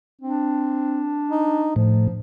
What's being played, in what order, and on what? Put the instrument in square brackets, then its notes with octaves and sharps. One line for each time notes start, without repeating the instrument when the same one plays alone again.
[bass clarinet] C4 [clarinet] D4
[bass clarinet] D#4
[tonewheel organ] A2 [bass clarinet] F3